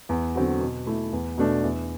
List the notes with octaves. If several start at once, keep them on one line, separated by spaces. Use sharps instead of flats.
E2
D3 F#3 C4 F#4
B2
A3 E4
E2
B2 A3 D4
E2